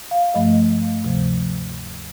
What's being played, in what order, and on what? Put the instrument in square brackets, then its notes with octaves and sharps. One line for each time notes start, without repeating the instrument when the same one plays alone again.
[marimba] F5
G2 F3 A3 D#5
D2 C3 F3